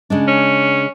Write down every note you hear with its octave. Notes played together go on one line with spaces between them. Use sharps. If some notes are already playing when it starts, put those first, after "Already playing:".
C#3 G#3 D4
C#4